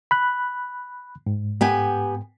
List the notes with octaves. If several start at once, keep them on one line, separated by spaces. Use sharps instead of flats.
B5 F#6
G#2
B3 G4 G#5